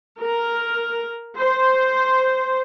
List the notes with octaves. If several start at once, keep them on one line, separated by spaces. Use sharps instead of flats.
A#4
C5